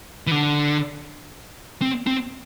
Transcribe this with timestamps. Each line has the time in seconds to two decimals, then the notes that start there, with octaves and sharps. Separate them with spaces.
0.27 E3
0.31 D3
1.82 C4
2.07 C4